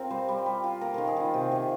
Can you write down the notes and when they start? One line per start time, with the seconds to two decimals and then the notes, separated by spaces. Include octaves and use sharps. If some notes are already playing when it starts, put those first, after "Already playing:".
Already playing: C4 F4 A#4
0.10 G3 C5
0.28 G3
0.46 G3
0.64 F4
0.81 A#3 A#4
0.94 D#3 A#4
1.07 G#4
1.16 D#3 F4
1.34 C3 G4
1.52 C3 G#4